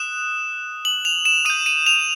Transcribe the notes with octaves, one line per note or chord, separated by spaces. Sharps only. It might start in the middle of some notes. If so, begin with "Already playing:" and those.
Already playing: D#6 F#6 E7
F#7
F7
E7
D#6 G6 D#7
D#7
F7